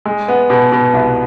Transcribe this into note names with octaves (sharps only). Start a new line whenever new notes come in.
G#3
B3
B2
B2
C2